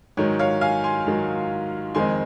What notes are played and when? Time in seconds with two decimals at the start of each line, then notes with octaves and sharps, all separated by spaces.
0.17 G#2 D#3 F#3 C#5
0.39 C#5 F5
0.61 F5 G#5
0.84 G#5 C6
1.06 G#2 D#3 F#3
1.95 F2 D#3 G#3 C4 G#5 C6